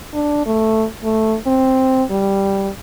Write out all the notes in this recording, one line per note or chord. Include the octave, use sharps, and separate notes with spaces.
D4
A3
A3
C4
G3